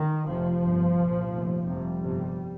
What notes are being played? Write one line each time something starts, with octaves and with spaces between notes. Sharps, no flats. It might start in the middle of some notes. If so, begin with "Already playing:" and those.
Already playing: D#3
F1 F2 C3 F3
G1 G2
C2 A#2
F1 D#2
F1 F2 C3 G3
G1 F2 C3